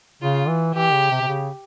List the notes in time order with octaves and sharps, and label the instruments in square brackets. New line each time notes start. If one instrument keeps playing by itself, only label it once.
[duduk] C#3 [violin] F4
[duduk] E3
[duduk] E3 [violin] G4
[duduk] C#3
C3
C3
C#3